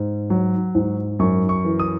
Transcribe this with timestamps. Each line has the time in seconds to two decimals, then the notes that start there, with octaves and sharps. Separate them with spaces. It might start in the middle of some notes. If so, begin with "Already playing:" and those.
Already playing: G#2
0.30 F#3
0.75 G#2
1.19 F#2 C#6
1.49 C#6
1.65 E3
1.79 D#6